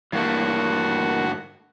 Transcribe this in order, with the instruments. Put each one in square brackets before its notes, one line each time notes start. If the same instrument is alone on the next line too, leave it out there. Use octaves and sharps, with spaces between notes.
[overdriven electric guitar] G2 A3 [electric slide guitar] E3 A#3 [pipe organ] F#4